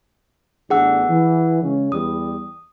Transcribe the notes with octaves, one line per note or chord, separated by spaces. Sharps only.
A1 B3 D4 G#4 F#5 E6
E3
C#3 G#3 C#4
E2 G3 D#6